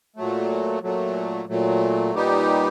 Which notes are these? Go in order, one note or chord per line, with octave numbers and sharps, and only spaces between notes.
A#2 F#3 A3
A#2 F#3 A3
A#2 F#3 A3
A#2 G3 B3 D#4 G4